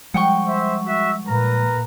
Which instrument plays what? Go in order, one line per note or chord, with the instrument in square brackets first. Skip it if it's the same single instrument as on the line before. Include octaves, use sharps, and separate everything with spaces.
[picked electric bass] F3 G3 G#3 [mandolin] F#5 G5 C#6
[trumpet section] C5 E5
F#4 E5
[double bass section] A#2 [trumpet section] A#4 B4 A#5